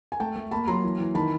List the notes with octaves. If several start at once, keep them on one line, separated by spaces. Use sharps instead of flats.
G#5
A3 G5 A5
A3
A#3 A5 B5
F#3 A#5 C6
E3
E3
D#3 A5 B5